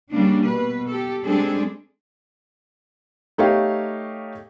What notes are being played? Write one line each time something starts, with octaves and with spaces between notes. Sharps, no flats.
C#3 G3 A#3 D4
B2 B4
G4 A4
G3 G#3 C4 D4 G#4 A4
A3 D#4 G4 C#5 F5